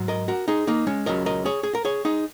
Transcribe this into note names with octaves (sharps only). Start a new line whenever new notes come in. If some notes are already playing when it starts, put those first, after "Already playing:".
Already playing: G#2 F#3
A#4 D#5
F#4 A#4
D#4 G#4
A#3 D#4
G#3 C#4
C#2 C#3 F#3 A#4 D#5
A#4 D#5
G#4 C#5
G#4
A#4
G#4 C#5
D#4 G#4